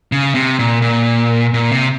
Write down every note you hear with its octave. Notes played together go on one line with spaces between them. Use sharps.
C#3
C3
A#2
A#2
A#2
C3